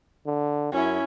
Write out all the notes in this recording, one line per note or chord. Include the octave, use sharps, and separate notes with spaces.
D3
F#2 C#4 E4